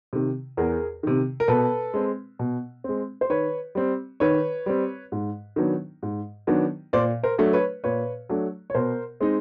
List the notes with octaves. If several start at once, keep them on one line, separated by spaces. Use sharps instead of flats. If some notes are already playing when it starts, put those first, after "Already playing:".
C3 D#3
E2 G#4 A#4
C3 D#3
A#4
B2 A4 B4
G#3 C4
B2
G#3 C4
C5
D#3 B4 C#5
G3 C4
D#3 B4 C#5
G3 C4
G#2
D#3 F#3 B3 D4
G#2
D#3 F#3 B3 D4
A#2 C5 D5
A#4 C5
F#3 A3 D4
B4 C#5
A#2 B4 C#5
F#3 A3 D4
C#5
B2 A#4 C5
G#3 C4 D#4